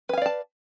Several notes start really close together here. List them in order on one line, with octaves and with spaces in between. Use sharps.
B4 G#5 F5 D5 A5